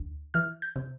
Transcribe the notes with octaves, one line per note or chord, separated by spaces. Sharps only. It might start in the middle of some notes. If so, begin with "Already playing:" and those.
Already playing: D2
E3 F6
G6
C3